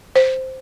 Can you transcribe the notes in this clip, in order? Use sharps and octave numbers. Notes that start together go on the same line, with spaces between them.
C5